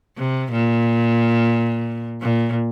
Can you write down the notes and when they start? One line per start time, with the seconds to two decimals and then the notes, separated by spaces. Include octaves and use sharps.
0.18 C3
0.52 A#2
2.22 A#2